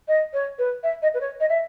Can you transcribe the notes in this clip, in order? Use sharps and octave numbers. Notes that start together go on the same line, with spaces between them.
D#5
C#5
B4
E5
D#5
B4
C#5
D#5
E5